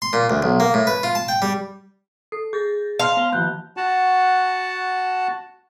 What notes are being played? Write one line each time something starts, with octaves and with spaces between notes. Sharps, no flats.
C6
A#2
D2
B1
A#3
A2
B4
F4
A5
G5
G3
A4 C7
G#4 G6 A6 A#6
F5 A5 C6
B3 A5 G7
D#3 F3 A#3 F#6 G6
F#4 F#5 A5